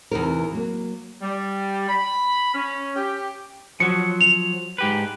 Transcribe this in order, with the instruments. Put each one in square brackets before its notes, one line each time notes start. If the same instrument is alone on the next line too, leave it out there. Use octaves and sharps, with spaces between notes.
[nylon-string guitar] E2 C3 D#4 A#4
F#3 A#3
[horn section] G3
B5
C#4
G4
[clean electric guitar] F3 F#3 [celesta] C#7
[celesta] F7
[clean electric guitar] G#2 G4 B4